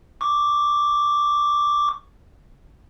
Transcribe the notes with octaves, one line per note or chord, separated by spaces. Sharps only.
C#6 D6